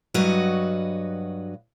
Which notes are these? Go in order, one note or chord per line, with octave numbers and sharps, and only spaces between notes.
G2 F#3 F#4 B4 D#5